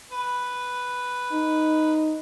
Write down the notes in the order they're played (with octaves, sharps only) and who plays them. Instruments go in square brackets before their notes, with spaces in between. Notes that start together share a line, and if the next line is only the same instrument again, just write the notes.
[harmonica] B4
[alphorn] D#4